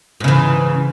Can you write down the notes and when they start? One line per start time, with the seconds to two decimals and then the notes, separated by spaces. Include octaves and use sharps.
0.20 G#2
0.24 C#3
0.28 E3